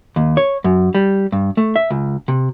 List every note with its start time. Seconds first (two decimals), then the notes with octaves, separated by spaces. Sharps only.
0.16 D#2
0.37 C#5
0.64 F#2
0.95 G3
1.32 G2
1.57 A3
1.76 E5
1.91 C#2
2.28 C3